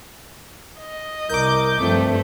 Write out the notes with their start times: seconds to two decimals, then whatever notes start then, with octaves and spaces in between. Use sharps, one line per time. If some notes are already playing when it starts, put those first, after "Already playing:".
0.79 D#5
1.29 C2 A#4 D6 G6
1.80 G2 F3 A3 C4